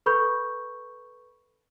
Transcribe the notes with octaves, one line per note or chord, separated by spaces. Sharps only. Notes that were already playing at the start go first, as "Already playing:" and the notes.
A4 B4 B5 C#6 G6